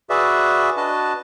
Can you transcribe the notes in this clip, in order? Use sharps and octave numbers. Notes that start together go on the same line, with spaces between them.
F#4 G#4 B4 D5 E5
D4 F#4 B4 D#5 A5